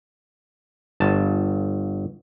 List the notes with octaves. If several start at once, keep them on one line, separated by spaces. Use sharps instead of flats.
G1 A5